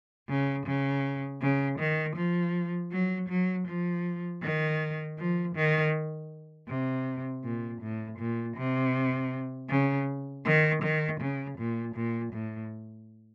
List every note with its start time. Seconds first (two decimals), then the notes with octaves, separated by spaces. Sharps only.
0.29 C#3
0.66 C#3
1.41 C#3
1.79 D#3
2.16 F3
2.91 F#3
3.29 F#3
3.67 F3
4.42 D#3
5.18 F3
5.55 D#3
6.68 C3
7.44 A#2
7.82 A2
8.19 A#2
8.57 C3
9.69 C#3
10.45 D#3
10.83 D#3
11.20 C#3
11.58 A#2
11.95 A#2
12.33 A2